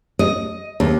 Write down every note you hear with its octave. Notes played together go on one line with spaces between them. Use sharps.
D#5
D#2